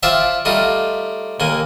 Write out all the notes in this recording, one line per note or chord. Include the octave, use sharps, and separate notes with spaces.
F4 C5 D5 E5 G5 A5
G3 A3 D#4 F4
D#2 A#3 G#5